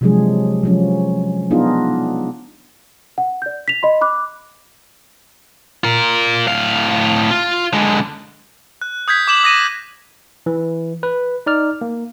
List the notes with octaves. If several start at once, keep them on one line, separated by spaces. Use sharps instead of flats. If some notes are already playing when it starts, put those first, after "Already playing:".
C3 F3 F#3 G#3 D4 G#4
F3 F#3 C#4
B3 D4 D#4 F4 G#4
F#5
D5 G6
B6 F7
D#5 B5 C6
B5 D6 F#6
F4 A#4
A2 F5
F4
D3 G#3
F#6
D#6 G6 G#6 B6
D6 E7 F#7
D#6 A#6 D#7 E7
E3
B4
D#4 D5 F6
A#3